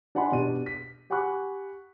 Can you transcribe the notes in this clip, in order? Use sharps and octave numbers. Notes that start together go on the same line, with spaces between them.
D4 D#4 F#5 G#5 B5 C6
B2 D4 G4 D#7
B6
G4 F#5 G#5 B5 C#6 F#6